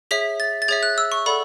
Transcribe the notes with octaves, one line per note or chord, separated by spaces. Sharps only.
G#4 C#5 E5 B6
A6
A6
G#4 C#5 E5 G#6
F#6
E6
C#6
A4 D5 F#5 B5